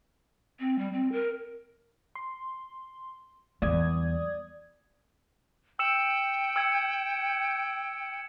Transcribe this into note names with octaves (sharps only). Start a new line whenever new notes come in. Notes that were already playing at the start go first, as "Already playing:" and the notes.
C4
G3
C4
A#4
C6
E2 G3 D5 D#6 G#6
G5 E6 C#7 E7
E6 G#6 C#7